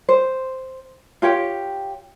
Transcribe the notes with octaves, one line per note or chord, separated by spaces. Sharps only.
C5
F4 G4 C#5 G5